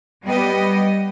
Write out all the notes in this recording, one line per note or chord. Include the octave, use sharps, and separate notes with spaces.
G3 B3 G4 D#5